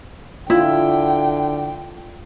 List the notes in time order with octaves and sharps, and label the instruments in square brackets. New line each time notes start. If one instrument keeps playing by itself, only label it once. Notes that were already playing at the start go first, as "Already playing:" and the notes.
[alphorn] D3 [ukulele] E4 [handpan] F4 [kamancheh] G5